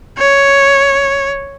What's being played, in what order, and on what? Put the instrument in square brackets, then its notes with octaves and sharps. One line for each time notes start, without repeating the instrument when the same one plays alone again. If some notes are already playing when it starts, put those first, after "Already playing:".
[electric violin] C#5